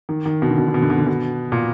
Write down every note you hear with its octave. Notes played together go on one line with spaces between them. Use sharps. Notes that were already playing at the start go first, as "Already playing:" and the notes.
D#3
D#3
B2
D3
B2
D3
B2
D3
B2
D3
B2
A#2